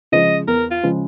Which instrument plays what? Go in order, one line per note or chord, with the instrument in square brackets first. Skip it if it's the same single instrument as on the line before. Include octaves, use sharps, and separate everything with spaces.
[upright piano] C#3 F3 G#3 [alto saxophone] D#5
[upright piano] E2 [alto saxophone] A#4
[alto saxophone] F4
[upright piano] C#3 F3 G#3